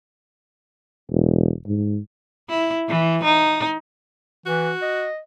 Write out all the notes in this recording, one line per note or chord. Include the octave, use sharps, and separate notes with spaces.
E1
G#2
E4
E3
D#4
E3 F#4
D#5